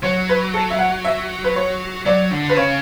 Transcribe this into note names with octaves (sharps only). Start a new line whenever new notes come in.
F#3 C#5
B4
A4
E5
F#5
E5
B4
C#5
F#3 D5
D3
B4
C#3 C#5